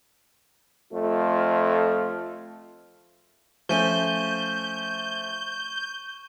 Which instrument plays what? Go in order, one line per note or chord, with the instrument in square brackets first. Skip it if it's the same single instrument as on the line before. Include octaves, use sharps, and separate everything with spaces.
[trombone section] F2 A3 F4
[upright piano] F3 A3 C#4 [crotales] C#6 D#7 G7 [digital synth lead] G6